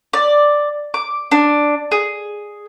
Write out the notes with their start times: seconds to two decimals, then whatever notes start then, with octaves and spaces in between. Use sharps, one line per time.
0.13 D5
0.94 D6
1.31 D4
1.91 G#4